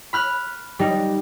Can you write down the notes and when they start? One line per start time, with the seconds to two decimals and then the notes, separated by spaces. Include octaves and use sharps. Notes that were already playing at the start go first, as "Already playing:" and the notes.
0.13 B5 F6 F#6
0.79 G3 D#4